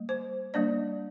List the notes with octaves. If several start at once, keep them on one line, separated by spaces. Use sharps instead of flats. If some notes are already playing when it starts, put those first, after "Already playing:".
Already playing: G3 A#3
C5
G3 A#3 D4 D5